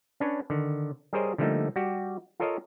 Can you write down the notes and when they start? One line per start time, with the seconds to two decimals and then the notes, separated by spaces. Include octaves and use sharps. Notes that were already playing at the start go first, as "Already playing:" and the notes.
0.20 C#4 D4 B4 C#5
0.50 D3 D#3
1.13 G3 G#4 A#4 C5 C#5 D#5
1.38 D3 F3 G3 A3 A#3 D#4
1.76 G3 F#4 G4
2.40 F4 A4 A#4 C#5 D#5 F5